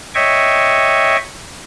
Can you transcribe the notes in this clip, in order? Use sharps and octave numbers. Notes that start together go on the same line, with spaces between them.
C#5 D#5 E5 G5 C#6